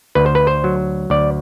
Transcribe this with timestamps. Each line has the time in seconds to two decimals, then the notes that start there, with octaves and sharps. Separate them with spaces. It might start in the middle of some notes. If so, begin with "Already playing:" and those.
0.15 D2 B4
0.26 C5
0.35 B4
0.47 C5
0.64 F#3
1.10 D2 D5